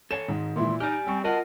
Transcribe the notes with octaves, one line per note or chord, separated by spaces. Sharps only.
A4 C#5 G#5 E7
G#2 D#3 G#3
A#2 E3 E4 C6
D#4 G4 D5 G#5 F6
G3 C4 C#6
F4 F#4 A#4 D#5 F#5 A5